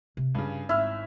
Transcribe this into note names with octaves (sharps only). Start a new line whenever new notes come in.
C3
G2 C#3 F4
G#1 E4 F6